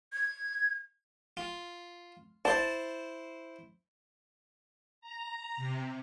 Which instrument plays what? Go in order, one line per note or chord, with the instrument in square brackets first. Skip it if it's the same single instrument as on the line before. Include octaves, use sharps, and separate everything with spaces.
[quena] G#6
[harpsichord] F4
[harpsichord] E4 C5 [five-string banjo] A5
[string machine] A#5
C3